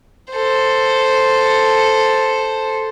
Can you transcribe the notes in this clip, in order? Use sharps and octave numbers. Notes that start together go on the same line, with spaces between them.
A4 C5